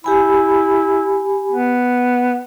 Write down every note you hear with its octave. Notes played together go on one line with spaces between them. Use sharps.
E4 G4 G#5 B5
B3